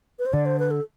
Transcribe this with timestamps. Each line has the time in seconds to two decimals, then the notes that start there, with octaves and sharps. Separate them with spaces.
0.19 B4
0.26 C5
0.33 D3 D5
0.46 C5
0.59 B4
0.71 A4